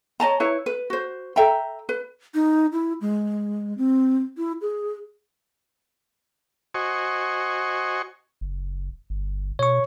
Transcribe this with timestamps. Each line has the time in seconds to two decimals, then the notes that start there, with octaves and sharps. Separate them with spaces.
0.20 C#5 D#5 A5 A#5
0.40 E4 B4 C#5
0.66 B4
0.90 F#4 C5
1.36 A4 E5 G5 A#5
1.89 B4
2.34 D#4
2.73 E4
3.01 G#3
3.78 C4
4.38 E4
4.61 G#4
6.74 F#4 C5 D#5 G#5 C#6
8.41 F#1
9.10 G1
9.59 B2 C#5 C#6